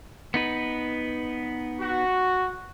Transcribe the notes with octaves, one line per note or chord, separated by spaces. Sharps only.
B3 D#4 B4
F#4